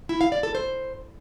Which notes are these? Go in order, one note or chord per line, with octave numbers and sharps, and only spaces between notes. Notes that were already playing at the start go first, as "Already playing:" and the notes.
E4
F5
D5
A4
C5